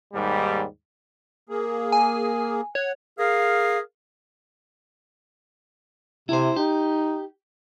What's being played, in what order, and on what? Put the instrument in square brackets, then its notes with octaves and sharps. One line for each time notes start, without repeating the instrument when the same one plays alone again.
[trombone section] D#2 G#2 G3
[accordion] A#3 G#4
[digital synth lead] G#5
[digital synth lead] C#5 [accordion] F#5
[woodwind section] G#4 A#4 F5
[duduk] C3 [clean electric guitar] E4 C5
[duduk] D#4 [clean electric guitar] G4